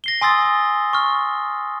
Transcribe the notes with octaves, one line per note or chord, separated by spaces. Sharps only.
A#6 C7 G7
G#5 C6 D#6 E6 A6
C#6 F6